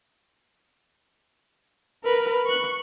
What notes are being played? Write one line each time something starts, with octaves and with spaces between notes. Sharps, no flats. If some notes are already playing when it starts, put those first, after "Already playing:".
A#4 B4
C#6 F#6